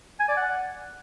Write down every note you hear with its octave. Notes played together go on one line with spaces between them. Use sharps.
G#5
D5
F#5